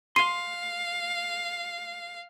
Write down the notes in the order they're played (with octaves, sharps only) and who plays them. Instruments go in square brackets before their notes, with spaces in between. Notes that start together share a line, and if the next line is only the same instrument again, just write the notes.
[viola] F5 [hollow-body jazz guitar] C6 [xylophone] C7 D#7 G7